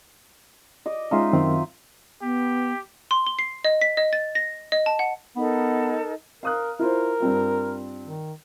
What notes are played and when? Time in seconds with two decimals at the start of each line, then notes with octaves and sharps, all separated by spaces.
0.86 D#5 D6
1.11 G#3 C#4 D#4 F4 E5
1.33 F#2 D#3 C4
2.22 B3 G4
3.11 C6
3.26 G7
3.39 C7
3.65 D#5
3.81 B6
3.97 D#5
4.13 A6
4.35 A#6
4.72 D#5
4.86 A5
4.99 F#5
5.36 B3 D#4 A4 A#4
6.43 A#4 F5 D#6 F#6
6.79 E4 F4 A#4 C5
7.20 G2 C4 F4
8.05 D#3